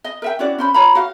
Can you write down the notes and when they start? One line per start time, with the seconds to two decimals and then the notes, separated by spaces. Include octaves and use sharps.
0.04 D#5
0.22 A#4 E5 G5
0.39 C#4 E4 F#4 D5
0.58 C#4 C5 B5
0.74 F4 C#5 A#5 B5
0.95 F#4 F5